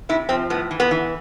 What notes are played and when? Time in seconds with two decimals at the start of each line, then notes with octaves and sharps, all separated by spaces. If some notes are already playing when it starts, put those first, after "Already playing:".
0.09 C3 E4
0.29 F3 C4
0.50 A2 B3
0.71 E3
0.80 B3
0.91 E3